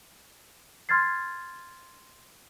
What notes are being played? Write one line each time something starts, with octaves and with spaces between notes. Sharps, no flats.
C6 F6 G#6 A6 C7